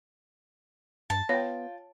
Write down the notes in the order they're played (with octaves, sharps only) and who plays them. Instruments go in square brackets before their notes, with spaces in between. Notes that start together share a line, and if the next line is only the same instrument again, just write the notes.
[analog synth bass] G2 [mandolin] A5
[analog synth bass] B3 [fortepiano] F4 G5 [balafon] C#5